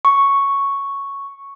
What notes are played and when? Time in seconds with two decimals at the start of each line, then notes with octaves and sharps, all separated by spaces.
0.05 C#6